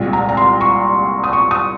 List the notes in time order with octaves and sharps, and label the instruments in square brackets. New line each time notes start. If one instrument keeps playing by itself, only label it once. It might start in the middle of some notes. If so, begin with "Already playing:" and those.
Already playing: [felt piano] C2 A#2 G#3
A#5
A#5
C6
C#6
D#6
C#6
D#6